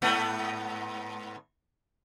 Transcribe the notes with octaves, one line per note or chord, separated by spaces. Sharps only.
G#2 A3 B3